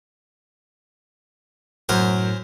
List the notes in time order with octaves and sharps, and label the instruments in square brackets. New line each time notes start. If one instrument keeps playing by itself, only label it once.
[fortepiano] F#2 [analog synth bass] A2 [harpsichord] A#4 C5 G#5